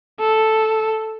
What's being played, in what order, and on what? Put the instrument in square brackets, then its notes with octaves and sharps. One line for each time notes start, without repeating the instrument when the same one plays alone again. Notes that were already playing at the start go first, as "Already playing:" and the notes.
[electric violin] A4